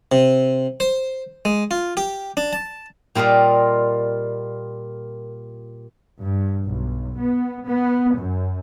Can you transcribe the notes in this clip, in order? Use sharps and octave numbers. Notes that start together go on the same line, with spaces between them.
C3
C5
G#3
F4
G4
D4
A5
A#2 G3 F4 A#4 D#5
G2
B1
B3
B3
F#2